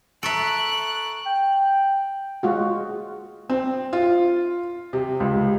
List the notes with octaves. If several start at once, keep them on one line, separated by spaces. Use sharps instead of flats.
A4 E5 A#5 C#6 F#6 D7
G5
G#3 F4 F#4
C4
F4
C3
C#2